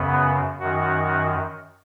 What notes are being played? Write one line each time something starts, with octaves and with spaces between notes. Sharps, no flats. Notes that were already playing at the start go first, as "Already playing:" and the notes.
Already playing: F#2 C#3 B3
F#2 D#3 F#4